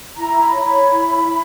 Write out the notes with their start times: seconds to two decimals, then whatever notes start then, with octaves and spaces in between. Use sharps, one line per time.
0.16 E4 A#5
0.40 B5
0.52 C#5 A#5
0.64 B5
0.89 E4
1.25 E4